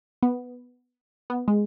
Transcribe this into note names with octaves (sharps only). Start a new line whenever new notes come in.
B3
B3
G#3